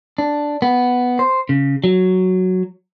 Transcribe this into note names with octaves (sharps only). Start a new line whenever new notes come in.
D4
B3
C5
C#3
F#3